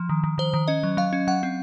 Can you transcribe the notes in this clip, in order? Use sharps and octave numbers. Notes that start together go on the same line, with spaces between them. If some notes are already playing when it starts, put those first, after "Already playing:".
Already playing: F3
D#3
D#3
D#3 C5
D#3
C#4 D#5
F#3
F#3 F5
C#4
F#3 F#5
C4